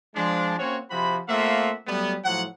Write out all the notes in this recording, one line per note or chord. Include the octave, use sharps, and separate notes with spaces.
F3 G#3 D4
A#3 C4 C#4 F#4 C#5
C3 F3 C4 F#4 B5
A3 A#3 C4 F4 E5 F#5
F#3 G3 A3 B3
A2 F3 F#3 F#5